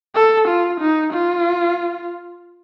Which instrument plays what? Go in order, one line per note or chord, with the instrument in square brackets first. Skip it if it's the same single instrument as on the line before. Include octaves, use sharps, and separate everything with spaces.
[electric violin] A4
F4
D#4
F4